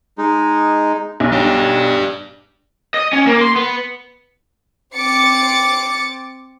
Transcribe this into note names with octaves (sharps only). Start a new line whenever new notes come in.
G#3 D#4
B1
D4 G4
D#5
C#4
A#3
C6
B3
C4 D6 A6 C#7